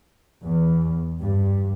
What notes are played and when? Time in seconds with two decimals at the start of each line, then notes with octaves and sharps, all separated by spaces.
0.44 E2
1.21 G2